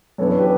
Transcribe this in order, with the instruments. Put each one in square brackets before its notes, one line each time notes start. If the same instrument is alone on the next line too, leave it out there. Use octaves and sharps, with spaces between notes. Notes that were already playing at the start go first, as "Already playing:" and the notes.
[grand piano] F#2 E3 B3 D4 A4 C#5
G4 B4